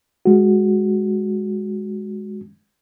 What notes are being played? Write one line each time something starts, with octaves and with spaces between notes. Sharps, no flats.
G#3 F#4